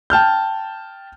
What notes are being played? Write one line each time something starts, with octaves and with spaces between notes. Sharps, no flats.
G5 A5 F6 G6